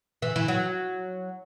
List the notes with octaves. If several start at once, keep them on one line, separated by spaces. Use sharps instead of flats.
E3
E3
F#3